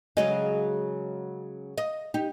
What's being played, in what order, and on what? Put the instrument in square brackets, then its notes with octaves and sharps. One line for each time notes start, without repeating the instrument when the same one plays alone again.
[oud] C#3 F#3 G#3 [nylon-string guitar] G#4 D#5
[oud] D#5
[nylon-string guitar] D#4 [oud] G4